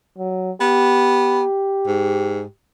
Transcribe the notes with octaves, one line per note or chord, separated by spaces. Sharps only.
F#3
B3 G4
G#2